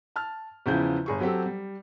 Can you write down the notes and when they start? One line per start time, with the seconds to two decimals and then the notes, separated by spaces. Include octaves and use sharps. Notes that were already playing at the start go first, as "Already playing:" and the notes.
0.16 A5 F6
0.66 E2 C#3 F3 E4 G#4 G6
1.06 G1 G#4 C#6
1.20 F#3 C4 G4 A4
1.46 G3